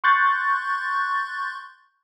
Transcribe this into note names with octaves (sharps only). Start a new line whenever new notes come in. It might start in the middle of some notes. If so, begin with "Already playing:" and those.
C6 C#6 F#6 G6 A6